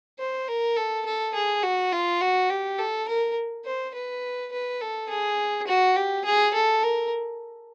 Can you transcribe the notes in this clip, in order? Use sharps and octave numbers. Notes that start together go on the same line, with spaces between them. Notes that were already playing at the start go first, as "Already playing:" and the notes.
C5
A#4
A4
A4
G#4
F#4
F4
F#4
G4
A4
A#4
C5
B4
B4
A4
G#4
F#4
G4
G#4
A4
A#4